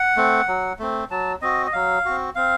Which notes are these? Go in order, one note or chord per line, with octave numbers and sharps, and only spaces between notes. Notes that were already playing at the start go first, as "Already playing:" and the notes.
Already playing: F#5
A3 C4
F#3
A3 C4
F#3 A5
C4 F#4 D#5
D#5
F#3 F5
C4 F#4
C4 F5